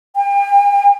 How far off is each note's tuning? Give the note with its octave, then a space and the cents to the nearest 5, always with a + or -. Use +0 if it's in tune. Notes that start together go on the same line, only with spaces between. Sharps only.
G5 +40